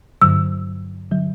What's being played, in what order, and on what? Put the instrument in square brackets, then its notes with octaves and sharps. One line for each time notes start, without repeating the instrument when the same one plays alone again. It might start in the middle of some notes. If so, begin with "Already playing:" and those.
[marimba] G2 D3 F#3 E6
D3 F#3